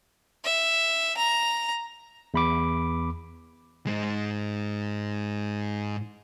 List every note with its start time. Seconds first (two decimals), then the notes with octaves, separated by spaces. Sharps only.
0.44 E5
1.17 A#5
2.34 E2 B5 D6
3.86 G#2 G#3